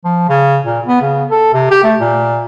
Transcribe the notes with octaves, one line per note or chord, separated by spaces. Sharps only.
F3
C#3
A#2
B3
C#3
A4
C3
G4
A3
A#2